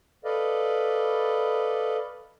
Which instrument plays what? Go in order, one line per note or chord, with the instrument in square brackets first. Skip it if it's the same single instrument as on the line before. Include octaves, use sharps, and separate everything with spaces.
[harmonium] A4 B4 D5 D#5 F5